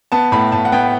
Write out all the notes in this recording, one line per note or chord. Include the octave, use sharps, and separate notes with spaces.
B3 A5
A2 B5
A2 A5
F#5
B3 G5